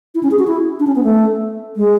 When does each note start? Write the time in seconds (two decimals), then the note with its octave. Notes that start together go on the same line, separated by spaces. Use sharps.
0.15 E4
0.23 C#4
0.31 G#4
0.39 F#4
0.47 E4
0.79 D4
0.87 C#4
0.96 B3
1.03 A3
1.76 G#3